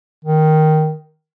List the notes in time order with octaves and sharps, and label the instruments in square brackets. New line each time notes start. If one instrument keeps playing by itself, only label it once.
[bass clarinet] D#3